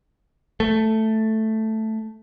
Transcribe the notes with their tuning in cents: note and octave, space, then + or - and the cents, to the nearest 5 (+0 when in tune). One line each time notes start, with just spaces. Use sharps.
A3 +0